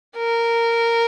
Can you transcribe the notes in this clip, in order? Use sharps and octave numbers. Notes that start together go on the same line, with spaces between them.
A#4